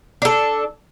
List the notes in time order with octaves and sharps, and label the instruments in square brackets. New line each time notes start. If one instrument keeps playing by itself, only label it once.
[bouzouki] D4 A4